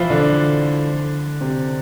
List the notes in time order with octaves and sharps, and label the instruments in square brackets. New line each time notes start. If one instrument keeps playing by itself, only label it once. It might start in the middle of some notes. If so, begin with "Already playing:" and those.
Already playing: [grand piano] E3 F3 E4 F4
D3 D4
C3 C4